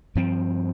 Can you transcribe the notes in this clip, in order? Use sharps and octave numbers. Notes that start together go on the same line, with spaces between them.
G2 F3 C4